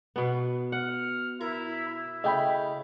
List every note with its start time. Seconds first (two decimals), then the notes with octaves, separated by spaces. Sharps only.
0.16 B2 B3
0.72 F#5 F6
1.41 E4 A#4
1.88 E4
2.24 C#3 A3 D#5 G5 B5